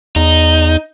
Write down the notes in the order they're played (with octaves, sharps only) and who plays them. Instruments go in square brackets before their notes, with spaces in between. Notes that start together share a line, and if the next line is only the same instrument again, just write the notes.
[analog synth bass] E2 [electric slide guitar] D#4